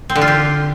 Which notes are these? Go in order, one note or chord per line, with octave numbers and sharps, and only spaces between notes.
C4
D3
F4
G4